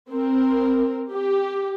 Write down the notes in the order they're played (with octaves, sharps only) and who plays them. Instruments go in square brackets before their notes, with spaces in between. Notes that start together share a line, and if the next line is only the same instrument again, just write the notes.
[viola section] C4 A#4
G4